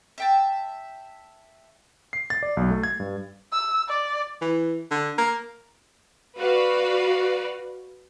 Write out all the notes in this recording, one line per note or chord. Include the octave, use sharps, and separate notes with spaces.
E5 G5 A5
C7
A6
D5
B1
A3
G#6
G2
E6
D5
E3
D3
A#3
F#4 B4 D5 F5